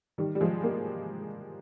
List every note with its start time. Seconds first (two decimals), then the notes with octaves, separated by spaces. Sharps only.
0.18 D#3 G3
0.35 G3
0.41 F3 G#3
0.63 G3 A#3